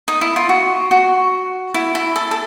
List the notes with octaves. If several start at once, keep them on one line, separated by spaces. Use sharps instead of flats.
D#4
E4
F4
F#4
F#4
E4
E4
A4
A4